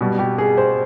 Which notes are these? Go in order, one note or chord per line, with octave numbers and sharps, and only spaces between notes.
B2 G3
G4
G#4
C5